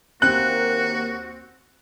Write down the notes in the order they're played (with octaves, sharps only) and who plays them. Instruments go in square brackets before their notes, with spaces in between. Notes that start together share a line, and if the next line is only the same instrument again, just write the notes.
[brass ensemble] D#2 A#3 [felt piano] C4 [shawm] F#4 [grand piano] F#6